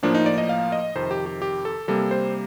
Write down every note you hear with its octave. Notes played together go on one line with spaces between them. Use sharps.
A2 F3 A#3 D4
D#4
D5
D#5
F5
D#5
F2 C3 D#3 C5
G4
G4
G4
A4
C3 G3 A#3 A4
C5